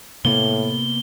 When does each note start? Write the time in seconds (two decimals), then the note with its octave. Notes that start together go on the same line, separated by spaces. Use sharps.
0.25 A2 C3 A#3 B3 G7